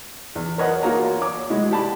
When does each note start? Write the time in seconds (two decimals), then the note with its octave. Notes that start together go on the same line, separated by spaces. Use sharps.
0.35 E2
0.58 A#4 B4 C#5 D#5 F#5
0.83 A#3 F4 F#4 G#4 C#5 A#5
1.21 C#5 D6
1.50 G#3 E4 F#4
1.71 G4 A5 B5